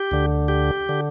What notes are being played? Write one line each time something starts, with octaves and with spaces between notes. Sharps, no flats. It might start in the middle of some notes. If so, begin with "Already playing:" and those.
Already playing: G4
D2 D3
G4
D3